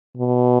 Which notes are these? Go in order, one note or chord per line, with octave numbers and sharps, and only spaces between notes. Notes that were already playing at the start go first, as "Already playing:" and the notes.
B2